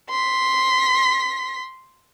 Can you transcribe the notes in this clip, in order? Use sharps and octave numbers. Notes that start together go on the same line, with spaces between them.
C6 B6